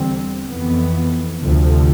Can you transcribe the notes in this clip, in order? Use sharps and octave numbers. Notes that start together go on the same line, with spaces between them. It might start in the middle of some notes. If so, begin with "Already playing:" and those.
Already playing: E2 D3 G3 C4
F2 E3 B3
D2 C3 F3